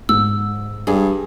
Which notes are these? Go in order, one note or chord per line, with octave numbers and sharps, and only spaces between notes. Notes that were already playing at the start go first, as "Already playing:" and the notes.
G#2 E6
G2 G#4